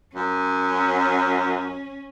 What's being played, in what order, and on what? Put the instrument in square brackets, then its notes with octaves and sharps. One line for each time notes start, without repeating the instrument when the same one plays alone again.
[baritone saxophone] F#2 [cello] C#4